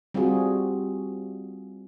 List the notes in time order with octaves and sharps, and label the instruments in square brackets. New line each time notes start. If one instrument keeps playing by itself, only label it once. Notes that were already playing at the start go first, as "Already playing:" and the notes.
[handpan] G3 C4 F4 F#4 G#4